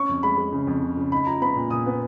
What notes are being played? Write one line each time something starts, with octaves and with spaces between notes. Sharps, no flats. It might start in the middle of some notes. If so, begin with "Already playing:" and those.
Already playing: C#4 C#6
F2
G#3 B5
G#3
C#3
F2
C#3
C#3
D#4 B5
F3 A#5
B3 B5
A#2
A#2 D#6
B3